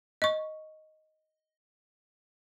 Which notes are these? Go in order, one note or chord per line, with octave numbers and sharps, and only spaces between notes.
D#5 C#6